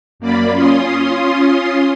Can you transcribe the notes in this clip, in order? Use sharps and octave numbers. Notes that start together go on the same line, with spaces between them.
F#2 A#3 D5 B5
C#4 F4 C6 D#6